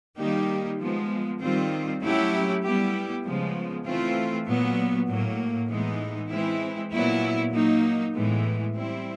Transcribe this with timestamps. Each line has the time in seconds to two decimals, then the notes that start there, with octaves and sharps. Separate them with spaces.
0.18 D#3 G3 A#3 D#4 G4
0.79 F3 G#3 B3
1.41 D#3 G3 C4 F4
2.01 F#3 A3 C#4 E4 G4
2.62 G3 B3 E4 G4
3.24 C#3 F3 G#3 B3
3.85 E3 A3 C4 F4
4.46 A#2 F#3 B3
5.08 A2 F#3 A#3
5.69 A2 E3 G#3 B3 D#4
6.30 E3 G#3 C4 E4
6.92 A#2 F#3 B3 E4
7.52 F#3 A#3 D#4
8.14 A2 E3 G#3 B3
8.74 G3 C4 E4